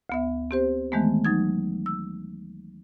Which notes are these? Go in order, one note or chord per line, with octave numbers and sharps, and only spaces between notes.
D2 B3 E5
C4 G4 C5
D#3 E3 G#3 A3 B3
F#3 D#4 G#6
E6